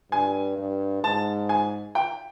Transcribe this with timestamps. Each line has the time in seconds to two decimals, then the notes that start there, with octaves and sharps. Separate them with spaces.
0.12 G2 G#5
0.58 G2
1.03 G#2 A5
1.49 G#5
1.95 G5